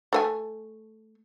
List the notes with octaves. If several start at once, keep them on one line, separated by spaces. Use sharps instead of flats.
A3 C5 G#5